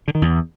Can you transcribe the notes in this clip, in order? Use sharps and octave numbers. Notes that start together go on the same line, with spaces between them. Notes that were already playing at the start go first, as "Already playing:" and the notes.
D3
D#3
E2